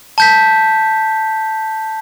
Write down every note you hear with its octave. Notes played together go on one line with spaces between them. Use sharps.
A5 G6 B6